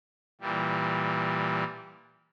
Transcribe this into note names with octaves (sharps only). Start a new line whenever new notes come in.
A#2 E3 G3